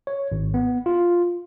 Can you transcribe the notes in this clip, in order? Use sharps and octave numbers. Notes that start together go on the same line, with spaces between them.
C#5
G#1
B3
F4